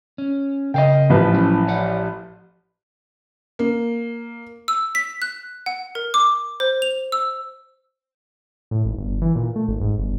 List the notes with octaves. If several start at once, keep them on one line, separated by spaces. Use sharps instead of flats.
C#4
C#3 A#4 D#5 F5 G5
A1 F3 B4
F#3 C#4 E4
C#5 D5 F#5
A#3
E6
B6
F#6
F#5
A#4
D6
C5
F7
E6
A2
G#1
G1
E3
A#2
A3
G#1
G#2
G1